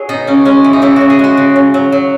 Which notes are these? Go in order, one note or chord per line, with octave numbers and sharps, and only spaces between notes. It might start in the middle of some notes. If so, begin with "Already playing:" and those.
Already playing: F#3 G#4
B2 D#4
C#3 C#4
G#3 C#4
E3
D#4
C#3 E4
C#3 F#4
G#4
G#3 F#4
C#3
C#3
F#3
F#3